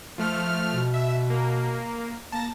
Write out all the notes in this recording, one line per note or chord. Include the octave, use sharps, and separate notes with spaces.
F3 A3 F6
B2
E5
A#3
A#3 A5 A#6